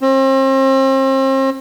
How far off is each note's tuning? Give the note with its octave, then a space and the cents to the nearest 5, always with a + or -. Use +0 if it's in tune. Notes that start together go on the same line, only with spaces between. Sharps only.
C4 +40